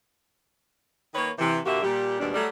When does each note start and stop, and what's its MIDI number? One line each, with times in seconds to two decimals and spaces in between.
1.14 1.29 51
1.14 1.29 58
1.14 1.29 71
1.14 1.29 73
1.38 1.58 48
1.38 1.58 52
1.65 1.82 46
1.65 1.82 50
1.65 1.82 58
1.65 1.82 66
1.65 1.82 67
1.65 1.82 76
1.82 2.17 46
1.82 2.17 55
1.82 2.17 67
2.19 2.31 39
2.19 2.31 44
2.19 2.31 47
2.19 2.31 55
2.19 2.31 62
2.34 2.47 54
2.34 2.47 55
2.34 2.47 57